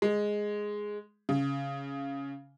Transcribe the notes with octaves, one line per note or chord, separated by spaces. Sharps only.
G#3
C#3